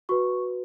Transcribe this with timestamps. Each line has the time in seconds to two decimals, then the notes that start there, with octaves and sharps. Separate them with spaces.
0.09 F#4 B4 C#6